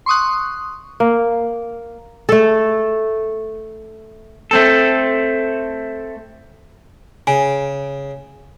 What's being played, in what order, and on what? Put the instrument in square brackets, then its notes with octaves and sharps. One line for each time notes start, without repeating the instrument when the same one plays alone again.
[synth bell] C6 C#6 D#6 F#6
[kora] A#3
A3 A4
[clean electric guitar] A3 C4 A4
[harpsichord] C#3 [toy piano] G#5